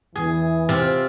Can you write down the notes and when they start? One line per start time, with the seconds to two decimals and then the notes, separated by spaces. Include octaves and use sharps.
0.15 E2 E3 G#4
0.69 C3 C4 F4